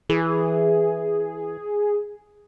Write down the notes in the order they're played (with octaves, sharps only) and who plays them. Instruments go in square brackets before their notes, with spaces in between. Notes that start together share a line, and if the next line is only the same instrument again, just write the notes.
[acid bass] E3 [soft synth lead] G#4